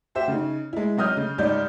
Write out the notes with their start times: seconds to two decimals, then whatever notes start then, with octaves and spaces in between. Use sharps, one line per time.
0.15 F#4 G4 C5 E5
0.28 C#3 D#4
0.73 G#3 E4
0.97 C3 F#3 D#5 D#6 F6 G6
1.17 C#3
1.38 C#2 G#2 G3 D5 G6